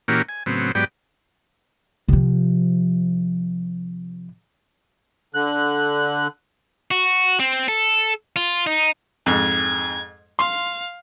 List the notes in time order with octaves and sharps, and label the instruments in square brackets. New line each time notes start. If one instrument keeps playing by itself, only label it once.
[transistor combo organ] A#2 E3 A#3 C#4 F#4 G4
G#5
A2 C#3 F#3 B3 C4
G#2 F#3 B3 G4 D5 G5
[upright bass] C3 F3
[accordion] D3 F#6
[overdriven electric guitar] F#4
C4
A4
F4
D#4
[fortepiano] F2 G#2 [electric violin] G#6
[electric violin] F5 [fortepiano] C6